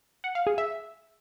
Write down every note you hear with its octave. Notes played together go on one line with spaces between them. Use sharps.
F#5
F5
G#4
E5